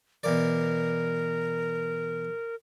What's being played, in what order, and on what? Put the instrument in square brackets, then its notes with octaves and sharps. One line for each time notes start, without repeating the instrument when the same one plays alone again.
[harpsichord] B2 E3 D5 [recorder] A#4